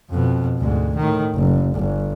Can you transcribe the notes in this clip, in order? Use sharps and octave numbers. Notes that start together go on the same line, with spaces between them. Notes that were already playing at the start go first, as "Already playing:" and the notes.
F2 B2
D2 G#2
A2 D#3
F#1
G1